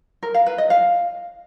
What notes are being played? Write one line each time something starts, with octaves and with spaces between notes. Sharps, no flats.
A#4
F5
B4
D#5
F5